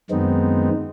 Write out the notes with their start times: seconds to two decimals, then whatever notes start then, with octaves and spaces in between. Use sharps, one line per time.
0.11 F#2 D#3 G#3 B3 C4 D#4